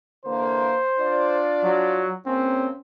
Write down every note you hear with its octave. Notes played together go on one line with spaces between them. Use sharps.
D3 E3 A#3 C5
D4 F4 D5
F#3
E2 A#3 C4 C#4